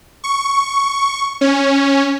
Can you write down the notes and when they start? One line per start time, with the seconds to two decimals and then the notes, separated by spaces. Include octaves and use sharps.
0.24 C#6
1.41 C#4